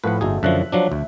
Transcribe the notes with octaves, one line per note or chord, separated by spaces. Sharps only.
A2 F3 B4 F#5
G1 A3 D#4 F#4 G#4
F#2 D3 F3 E5 F#6
F3 F#3 D4
D2